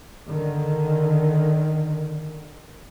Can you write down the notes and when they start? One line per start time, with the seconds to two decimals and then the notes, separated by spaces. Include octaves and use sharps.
0.27 D3 D#3